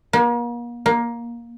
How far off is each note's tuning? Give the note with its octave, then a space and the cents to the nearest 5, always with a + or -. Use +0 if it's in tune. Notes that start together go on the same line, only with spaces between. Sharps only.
A#3 +40
A#3 +15